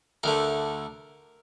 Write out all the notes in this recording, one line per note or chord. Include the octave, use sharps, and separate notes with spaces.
D2 D3 A3 A#4